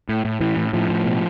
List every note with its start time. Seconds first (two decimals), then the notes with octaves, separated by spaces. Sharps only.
0.09 A2
0.25 A2
0.41 A2 E3
0.57 A2
0.73 A2 F3
0.89 A2
1.05 B2